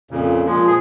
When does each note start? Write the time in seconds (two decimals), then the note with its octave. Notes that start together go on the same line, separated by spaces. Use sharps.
0.11 F2 A#2 C#3
0.46 A#2 F3 G#3
0.67 G#4